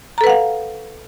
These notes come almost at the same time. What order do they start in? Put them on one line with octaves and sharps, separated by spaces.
A#5 A4 B4 F#5 F5